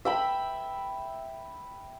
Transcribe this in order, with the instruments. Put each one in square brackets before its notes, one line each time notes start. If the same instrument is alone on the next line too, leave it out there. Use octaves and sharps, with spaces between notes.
[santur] E5 G5 B5